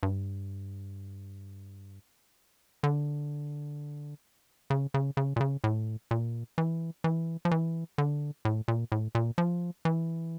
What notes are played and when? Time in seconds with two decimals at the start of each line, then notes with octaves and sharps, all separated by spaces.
0.03 G2
2.83 D3
4.70 C#3
4.94 C#3
5.17 C#3
5.36 A#2
5.41 C#3
5.64 A2
6.11 A#2
6.58 E3
7.04 E3
7.45 F3
7.51 E3
7.98 D3
8.45 A2
8.68 A#2
8.92 A2
9.15 A#2
9.38 F3
9.85 E3